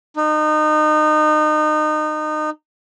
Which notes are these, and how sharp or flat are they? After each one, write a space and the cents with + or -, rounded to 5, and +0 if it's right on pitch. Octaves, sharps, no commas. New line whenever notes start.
D#4 -25